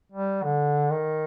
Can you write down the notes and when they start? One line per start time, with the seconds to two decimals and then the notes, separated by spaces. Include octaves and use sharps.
0.12 G3
0.43 D3
0.91 D#3